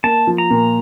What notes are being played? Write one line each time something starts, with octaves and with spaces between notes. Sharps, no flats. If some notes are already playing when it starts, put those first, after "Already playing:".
A#3 A5
F3
A#5
A#2